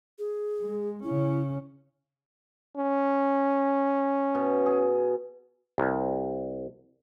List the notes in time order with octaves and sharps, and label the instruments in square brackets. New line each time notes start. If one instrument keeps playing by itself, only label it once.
[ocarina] G#4
[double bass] G#3
[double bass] C#3 C#4 [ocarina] E4
[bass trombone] C#4
[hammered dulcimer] B2
G#4
[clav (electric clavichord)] C2